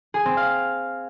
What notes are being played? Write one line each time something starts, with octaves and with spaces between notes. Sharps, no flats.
G#4
C4
F5